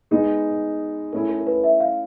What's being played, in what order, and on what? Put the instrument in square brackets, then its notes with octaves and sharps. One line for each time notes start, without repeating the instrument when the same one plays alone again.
[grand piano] G#3 B3 D#4 [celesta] G#4
[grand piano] A3 C#4 E4 [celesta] A#4
[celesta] A#4
A#4
B4
E5
F5